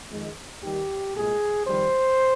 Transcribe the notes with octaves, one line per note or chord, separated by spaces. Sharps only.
F2 D#3 G#3
D#2 D#3 G3 G4
C2 A#2 G#3 G#4
F2 D#3 G3 C5